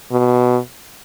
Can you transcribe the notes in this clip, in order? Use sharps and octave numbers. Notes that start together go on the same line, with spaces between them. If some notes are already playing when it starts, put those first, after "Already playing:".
B2